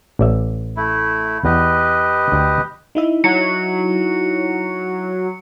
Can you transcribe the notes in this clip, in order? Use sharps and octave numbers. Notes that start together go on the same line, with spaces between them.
A1 D5 E5
A3 E4
E2 G4 B4 D#5
D2 G5
D#4 E4 E5
F#3 C#7